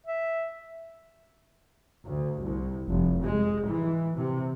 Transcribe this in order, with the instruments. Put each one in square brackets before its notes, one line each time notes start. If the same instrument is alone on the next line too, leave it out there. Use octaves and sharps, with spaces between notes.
[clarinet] E5
[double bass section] D2
C2
F1
G#3
E3
C3